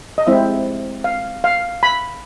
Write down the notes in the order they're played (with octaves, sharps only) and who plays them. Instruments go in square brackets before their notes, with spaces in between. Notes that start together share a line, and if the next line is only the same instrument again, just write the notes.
[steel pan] D#5
G#3 C4 E4 E5
F5
F5
B5